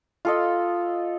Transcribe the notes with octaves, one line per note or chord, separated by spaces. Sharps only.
F4 A4 D#5